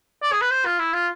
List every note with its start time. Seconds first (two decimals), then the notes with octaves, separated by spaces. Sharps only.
0.23 D5
0.32 G#4
0.41 B4
0.51 C5
0.65 F4
0.79 E4
0.93 F4